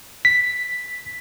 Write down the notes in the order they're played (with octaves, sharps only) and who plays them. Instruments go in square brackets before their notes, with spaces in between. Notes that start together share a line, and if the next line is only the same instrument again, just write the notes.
[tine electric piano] B6